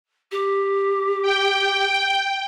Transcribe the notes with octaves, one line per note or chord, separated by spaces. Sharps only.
G4
G5